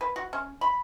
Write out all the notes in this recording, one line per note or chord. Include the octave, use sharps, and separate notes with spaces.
B4
F#4
C#4
B5